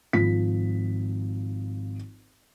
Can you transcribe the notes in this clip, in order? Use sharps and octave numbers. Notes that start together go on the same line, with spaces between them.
G#1 F3 B6